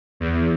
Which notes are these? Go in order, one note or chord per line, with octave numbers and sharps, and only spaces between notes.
E2